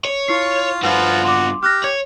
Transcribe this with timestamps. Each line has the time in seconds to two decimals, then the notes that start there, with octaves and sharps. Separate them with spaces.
0.05 C#5
0.28 E4 F4 C#6 C7
0.83 G2 F3 F4 F#4 B4
1.24 F#4 C6 D6
1.63 G4 F6 F#6 A#6
1.84 C#5 G#6